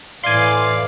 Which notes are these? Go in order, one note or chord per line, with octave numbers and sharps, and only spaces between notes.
A2 E3 D5 F5 G#5 C6